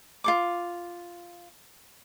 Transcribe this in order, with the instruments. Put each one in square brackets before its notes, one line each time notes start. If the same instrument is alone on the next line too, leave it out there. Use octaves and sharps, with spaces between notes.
[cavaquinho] F4 A4 D6